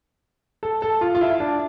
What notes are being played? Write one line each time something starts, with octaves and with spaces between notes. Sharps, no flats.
A4
A4
F4
F4
E4
D4